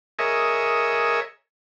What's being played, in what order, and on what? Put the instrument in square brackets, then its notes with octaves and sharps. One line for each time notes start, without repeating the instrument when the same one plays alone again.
[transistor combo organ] G#4 A#4 C#5 D#5 E5